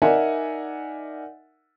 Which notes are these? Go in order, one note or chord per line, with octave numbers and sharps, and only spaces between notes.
D#4 A#4 D5 E5 F#5 G#5